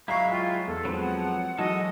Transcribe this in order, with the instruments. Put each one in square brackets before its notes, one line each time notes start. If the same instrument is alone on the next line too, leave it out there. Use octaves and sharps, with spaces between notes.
[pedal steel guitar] F#3 G#3 E4 [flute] F5 [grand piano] A#5 C#6
[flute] F4 [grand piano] G5
[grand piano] E2 [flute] A4
[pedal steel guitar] F3 F#3 [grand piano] G#3 C4 B4
[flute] F#5
[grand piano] E3 F#3 F#4 [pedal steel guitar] G#3 A4 [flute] D#5